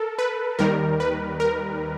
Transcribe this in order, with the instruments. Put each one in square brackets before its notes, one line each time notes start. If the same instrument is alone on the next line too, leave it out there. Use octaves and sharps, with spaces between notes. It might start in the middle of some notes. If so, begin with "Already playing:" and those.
Already playing: [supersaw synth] A4 A#4
B4
D#2 D#3 G3 A#4
B4
A#4